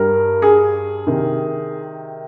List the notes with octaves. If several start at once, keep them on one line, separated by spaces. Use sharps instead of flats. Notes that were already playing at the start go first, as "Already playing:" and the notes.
Already playing: G2 G3 A#4
G#4
C3 D#3